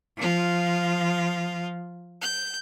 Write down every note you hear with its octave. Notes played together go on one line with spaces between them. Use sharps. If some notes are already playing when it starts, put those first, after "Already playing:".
F3 F4
G6